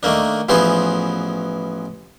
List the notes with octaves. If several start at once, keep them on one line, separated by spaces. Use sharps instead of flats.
D#3 A3 A#3 D4
A1 E3 F3 B3 G#4 C5